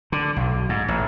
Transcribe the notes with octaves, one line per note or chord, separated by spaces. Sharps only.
D3
B1
G#2
A1